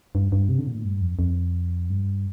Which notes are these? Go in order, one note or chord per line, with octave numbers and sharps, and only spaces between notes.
G2
G2
C3
D3
A#2
A2
G2
F2
F2
G2